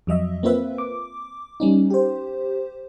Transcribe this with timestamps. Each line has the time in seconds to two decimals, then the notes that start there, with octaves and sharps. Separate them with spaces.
0.07 F2 F#3 D#5 E5
0.43 A#3 C4 F4 B4 E5
0.78 D6
1.60 G3 C#4 D#4
1.90 G4 C5